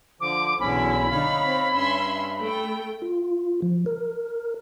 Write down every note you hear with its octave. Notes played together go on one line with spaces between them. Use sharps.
D3 F3 D6
B1 E2 B2 D3 C#4 E4 B5
D3 D4 D#4 C#5 F5
C4
G2 C#4 E5 C6
A3 G5
F4
F3
A#4